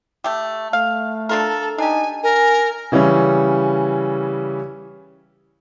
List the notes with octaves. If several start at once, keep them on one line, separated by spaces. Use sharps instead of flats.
A3 G4
A3 F5
D4 F4 A4 A#4
D4 D#4 G4 G#5
A#4 G#5
C#3 E3 G3 C#4